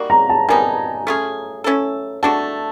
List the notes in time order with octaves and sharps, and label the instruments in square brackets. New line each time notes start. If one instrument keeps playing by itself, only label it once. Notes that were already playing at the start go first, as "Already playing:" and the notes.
Already playing: [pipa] G3 A#3 D#4 F#4
[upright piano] A#5
A5
[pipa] D#3 G3 B3 D#4 [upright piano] G#5
[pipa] A3 C#4 F4 G#4
A3 C#4 E4 A4
[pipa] A3 D4 F#4 [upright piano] A5